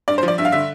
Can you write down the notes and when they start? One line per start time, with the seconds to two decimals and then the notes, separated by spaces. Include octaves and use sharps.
0.08 G2 D5
0.18 C5
0.23 F3
0.28 D5
0.38 G2 E5
0.45 F5
0.52 D3 E5